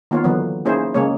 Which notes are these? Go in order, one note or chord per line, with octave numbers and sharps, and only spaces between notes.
D#3 A#3 B3 F4 C#5
D3 E3 F#3 B3
A#3 C#4 D#4 E4 G#4 C5
C#3 G#3 A#3 C#4 C#5